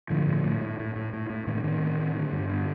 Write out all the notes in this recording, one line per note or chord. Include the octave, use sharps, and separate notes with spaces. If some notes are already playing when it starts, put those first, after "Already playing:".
A2 D3 F3
A2
A2
A2
A2
A2
A2
A2
A2 D#3
D3
A2 D#3
A2
A2
D3
G2
D3